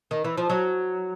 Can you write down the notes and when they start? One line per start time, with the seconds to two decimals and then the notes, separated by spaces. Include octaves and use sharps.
0.11 D#3
0.24 E3
0.38 F3
0.50 F#3